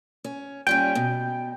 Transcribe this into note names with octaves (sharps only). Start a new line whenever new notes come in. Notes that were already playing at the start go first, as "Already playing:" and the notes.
C#4
A#2 G3 C#4 G5
B2